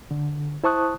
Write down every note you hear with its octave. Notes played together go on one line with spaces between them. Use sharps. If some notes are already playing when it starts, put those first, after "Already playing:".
D3
E4 C5 A5 C#6 D#6 F#6